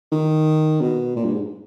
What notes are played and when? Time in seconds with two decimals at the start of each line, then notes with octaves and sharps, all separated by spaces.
0.12 D#3
0.81 B2
1.16 A#2
1.25 G2
1.33 G#2